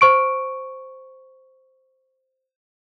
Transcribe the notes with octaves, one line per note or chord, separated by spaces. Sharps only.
C5 C#6 D7